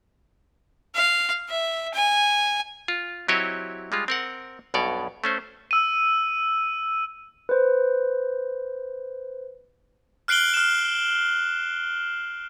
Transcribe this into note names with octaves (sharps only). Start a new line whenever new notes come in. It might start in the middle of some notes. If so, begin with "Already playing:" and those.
F5
E5
G#5
F4
F#3 C4 E4 G4 C#5 D#5
G3 G#3 F4
C4 A#4 F#5
B1 G2 B2 C#5 D5
A3 C#4 C5
E6 D#7
B4 C5
F6 F#6 C7 D7 F#7 G7
F6 E7